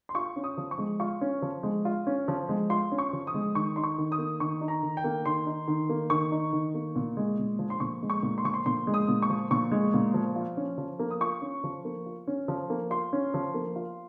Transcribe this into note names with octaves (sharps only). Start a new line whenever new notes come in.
C6
F4 C#6
C#4
D#6
F3
C#6
G#3
F4 C#6
C#4
F3
G#3
F4
C#4
F3
G#3
F4 C6
C#4
C#6
F3
D#6
G#3
D#3 C#6
D#4 C6
C#6
D#3
D#6
A#3
D#3 C#6
D#4
A#5
D#3
G5
A#3
D#3 C6
D#4
D#3
A#3
D#3 C#6
D#4
D#3
A#3
A#2
G#3
A#2
F3
C6
A#2 C#6
G#3
C#6
A#2
C6
F3 C#6
C6
A#2 C6
G#3
D#6
A#2
C#6
F3
A#2 C#6
G#3
A#2
F3
F4
C#4
F3
A#3
D#6
F4 C#6
C#4
F3
A#3
F4
C#4
F3
A#3
F4 C6
C#4
F3
A#3
F4